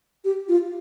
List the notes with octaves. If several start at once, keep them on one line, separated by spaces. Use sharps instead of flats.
G4
F4